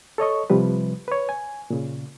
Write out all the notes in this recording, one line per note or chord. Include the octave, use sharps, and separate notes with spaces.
A4 C#5 D#5 C#6
C3 F3 G3 B4
B4 C#5
G#5
A#2 C#3